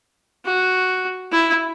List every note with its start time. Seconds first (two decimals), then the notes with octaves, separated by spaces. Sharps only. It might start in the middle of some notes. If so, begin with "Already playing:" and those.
0.45 F#4
1.32 E4